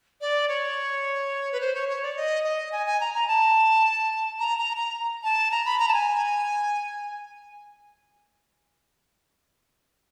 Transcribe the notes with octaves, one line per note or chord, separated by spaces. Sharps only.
D5
C#5
B4
C5
C#5
C#5
D5
D#5
D#5
G#5
G#5
A#5
A#5
A5
A#5
A#5
A#5
A5
A#5
B5
A#5
A5
G#5